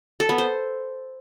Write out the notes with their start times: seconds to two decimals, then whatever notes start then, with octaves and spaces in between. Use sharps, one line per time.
0.20 A4
0.29 B3
0.38 C5